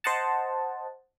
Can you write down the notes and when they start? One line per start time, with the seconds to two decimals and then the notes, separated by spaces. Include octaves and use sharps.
0.04 C5 D#5 F#5 A5